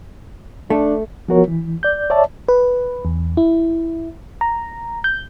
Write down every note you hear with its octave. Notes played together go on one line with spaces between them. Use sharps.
A3 D4
F3 B3 F#4 A#4 C#5
E3
D5 G6
C#5 D5 E5 A5
B4
E2
E4
A#5
G6